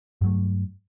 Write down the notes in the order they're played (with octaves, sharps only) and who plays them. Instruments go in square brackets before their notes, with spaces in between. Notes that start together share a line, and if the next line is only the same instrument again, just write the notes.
[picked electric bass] G2 F#3 A3